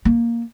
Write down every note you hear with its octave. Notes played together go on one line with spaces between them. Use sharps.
A#3